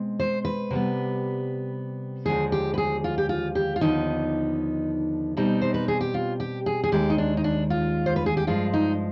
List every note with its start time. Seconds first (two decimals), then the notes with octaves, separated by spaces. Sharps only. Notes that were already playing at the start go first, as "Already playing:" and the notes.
Already playing: B2 G#3 C4
0.20 C5
0.45 B4
0.70 C3 G3 B3
2.26 D#2 D3 F3 G#3 G#4
2.52 G4
2.74 B4
2.78 G#4
3.04 F4
3.18 G4
3.29 F4
3.55 G4
3.76 F4
3.81 D#2 D3 F3 B3 D#4
5.37 B2 G3 C4 D#4
5.62 C5
5.74 B4
5.88 G#4
6.01 G4
6.14 F4
6.40 G4
6.66 G#4
6.84 G#4
6.92 D#2 D#3 G#3 G4
7.10 D#4
7.18 D4
7.37 D#4
7.44 D4
7.70 F4
8.06 C5
8.16 B4
8.26 G#4
8.37 G4
8.47 G2 F3 G#3 F4
8.73 D#4